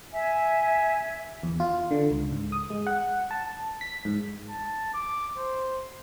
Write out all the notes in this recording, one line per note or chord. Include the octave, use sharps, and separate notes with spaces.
E5 G#5
E2
F4
D3
C#2
G#2
D#6
G#3
F#5
A5
B6
G#2
A5
D6
C5